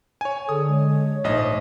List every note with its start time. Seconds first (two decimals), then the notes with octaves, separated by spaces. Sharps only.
0.21 C#5 G#5
0.49 D3 G#4 A4 D#6
0.69 G#3 C#5
1.24 A#1 G#2 A3 D#5